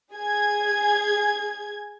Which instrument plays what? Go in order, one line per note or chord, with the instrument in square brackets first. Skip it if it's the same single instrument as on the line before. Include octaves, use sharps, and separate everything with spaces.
[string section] G#4 G#6